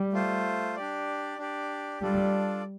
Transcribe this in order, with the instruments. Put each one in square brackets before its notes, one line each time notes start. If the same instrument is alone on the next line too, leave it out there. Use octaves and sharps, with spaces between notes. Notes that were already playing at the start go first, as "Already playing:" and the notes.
Already playing: [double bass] G3
[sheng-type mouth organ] A3 F4 C5
D4 G4 D5
D4 G4 D5
[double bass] G3 [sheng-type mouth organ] D4 F4 A4 D5